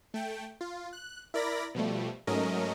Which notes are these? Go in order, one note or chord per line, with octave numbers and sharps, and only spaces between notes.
A3 G5
F4
F#6
E4 A#4 D5 B5 A#6
B2 F3 G3 A3
G#2 F#3 A3 C#4 A#4 D#5